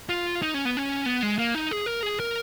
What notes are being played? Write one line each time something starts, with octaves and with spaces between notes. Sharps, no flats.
F4
D#4
C#4
B3
C#4
B3
G#3
A#3
D#4
G#4
A#4
G#4
A#4